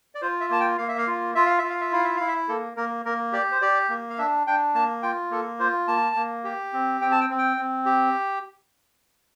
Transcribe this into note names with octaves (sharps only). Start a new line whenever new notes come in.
D5
F4 C5
E5
A#3 A5
G5
A#3 F5
E5
F5
F4
F4 E5
F5
F4 E5
F5
E5
E4 F5
E5
E4 F5
E5
A#3 A4
A#3 A#4
A#3 A#4
G4 D5
C5
G4 D5
A#3
F5
D4 E5
D4 G5
A#3 A5
F4 G5
A#3 A4
F4 C5
A#3 A5
A#3
G4
C4
C4 G5
A5
G5
C4
G5
C4
G4